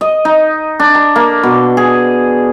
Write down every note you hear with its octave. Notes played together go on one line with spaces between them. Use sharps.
D#5
D#4
D4
A#5
A#3
B2
G#4